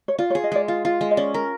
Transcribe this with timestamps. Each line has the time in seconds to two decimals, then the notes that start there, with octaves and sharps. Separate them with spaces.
0.08 C#5
0.18 F4 D5
0.30 C#5
0.35 G#4
0.44 D#5
0.52 G#3 D5
0.68 F4
0.85 F4
1.01 G#3
1.11 D#5
1.17 C#4 D5
1.34 A#4